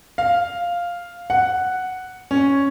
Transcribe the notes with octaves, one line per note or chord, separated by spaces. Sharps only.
F5
F#5
C#4